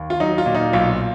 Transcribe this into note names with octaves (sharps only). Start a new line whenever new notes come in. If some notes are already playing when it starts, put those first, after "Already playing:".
Already playing: D#2
F4
F#3 D#4
F4
A#2
D#4
B1 F4